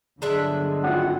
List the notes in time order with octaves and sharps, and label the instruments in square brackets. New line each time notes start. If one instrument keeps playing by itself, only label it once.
[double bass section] G1 D3 F#3 [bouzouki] G#3 D4 E5
[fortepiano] G#1 F4 [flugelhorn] F#5